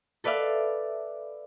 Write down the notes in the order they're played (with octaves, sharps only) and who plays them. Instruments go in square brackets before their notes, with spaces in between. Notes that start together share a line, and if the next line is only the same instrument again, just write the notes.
[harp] A4 B4 D5 E5 F5